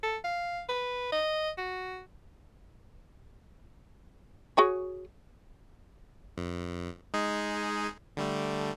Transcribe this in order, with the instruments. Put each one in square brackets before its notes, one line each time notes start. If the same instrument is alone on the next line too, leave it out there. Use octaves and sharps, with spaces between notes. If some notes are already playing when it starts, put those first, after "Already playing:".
[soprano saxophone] A4
F5
B4
D#5
F#4
[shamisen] F#4 G#4 C#5
[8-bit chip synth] F2
G#3 D#4 G#4
D3 G3 A3